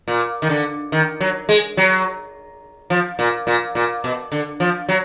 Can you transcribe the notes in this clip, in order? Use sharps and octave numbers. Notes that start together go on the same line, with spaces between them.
A#2
D#3
D3
D#3
F#3
G#3
F#3
F3
A#2
A#2
A#2
B2
D3
F3
F#3